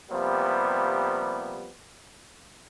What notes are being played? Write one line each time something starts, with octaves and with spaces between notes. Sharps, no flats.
C3 F3 G3 A#3 B3